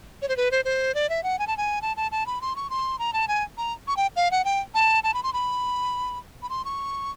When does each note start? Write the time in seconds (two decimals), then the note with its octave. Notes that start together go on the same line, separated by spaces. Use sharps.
0.22 C#5
0.29 C5
0.37 B4
0.51 C5
0.65 C5
0.94 D5
1.09 E5
1.23 F#5
1.39 G#5
1.47 A5
1.57 G#5
1.82 A5
1.97 A5
2.11 A5
2.26 B5
2.41 C6
2.56 C#6
2.70 C6
2.99 A#5
3.13 A5
3.28 G#5
3.57 A#5
3.87 C#6
3.97 G5
4.16 F5
4.31 F#5
4.45 G5
4.74 A5
5.03 A5
5.14 B5
5.23 C6
5.33 B5
6.42 B5
6.49 C6
6.65 C#6